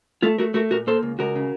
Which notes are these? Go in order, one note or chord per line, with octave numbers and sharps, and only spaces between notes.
A3 F4 A4
A3 F#4 A#4
A3 F#4 A#4
A#2 F#4 A#4
A#3 A4 C5
C#2
C#2 F#4 A#4
C#3